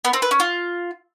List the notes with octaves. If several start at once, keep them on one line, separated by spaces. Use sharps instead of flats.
B3
C4
B4
C#4
F4